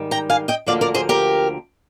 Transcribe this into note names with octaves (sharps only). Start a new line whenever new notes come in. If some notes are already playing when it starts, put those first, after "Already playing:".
Already playing: G#2 D#3 G3
G5 A#5
F5 G#5
D#5 G5
D2 D3 F3 A#3 D5 F5
A#4 D5
G#4 C5
G4 A#4